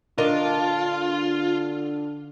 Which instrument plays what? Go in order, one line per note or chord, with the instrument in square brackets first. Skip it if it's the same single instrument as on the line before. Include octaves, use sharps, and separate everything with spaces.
[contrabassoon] D3 [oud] D4 A#4 D#5 [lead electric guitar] F4